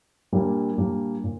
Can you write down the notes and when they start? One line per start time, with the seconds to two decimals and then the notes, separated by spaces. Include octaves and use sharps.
0.32 A#2 G3 A#3 D4
0.78 A#2 G3 A#3 D4
1.24 A#2